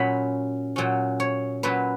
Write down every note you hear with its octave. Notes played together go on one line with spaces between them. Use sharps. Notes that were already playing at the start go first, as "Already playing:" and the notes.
Already playing: A#2 F#3 C#4 B5
A#2 F#3 C#4
C#5
A#2 F#3 C#4 B4